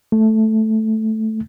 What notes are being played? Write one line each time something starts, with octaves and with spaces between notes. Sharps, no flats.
A3